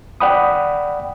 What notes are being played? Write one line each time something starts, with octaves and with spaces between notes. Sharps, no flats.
D5 F#5 G5 B5 D#6